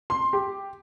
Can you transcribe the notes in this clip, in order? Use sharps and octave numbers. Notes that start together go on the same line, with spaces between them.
C6
G4